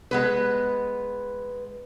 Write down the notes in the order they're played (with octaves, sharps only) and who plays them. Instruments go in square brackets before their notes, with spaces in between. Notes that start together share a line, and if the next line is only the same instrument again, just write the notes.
[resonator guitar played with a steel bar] G#3 B3 B4